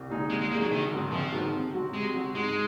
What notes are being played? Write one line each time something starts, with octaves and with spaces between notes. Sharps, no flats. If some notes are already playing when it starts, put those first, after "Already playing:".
Already playing: C2
A#2 G#3 D#4 G#4
C2 G#3
G#3
A#2 G#3 A#3 D#4 G#4
F#3
A#1 D#3
G#2 D#3 F#3 C4
A#1 F3
G#2 D#3 F#3 C4
C3
F#3 C4 F#4
C3 G#3
F#3 C4 F#4
G#2 G#3